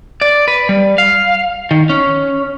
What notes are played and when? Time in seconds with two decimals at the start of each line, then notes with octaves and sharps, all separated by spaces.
0.21 D5
0.48 B4
0.69 G3
0.98 F5
1.71 D#3
1.89 C#4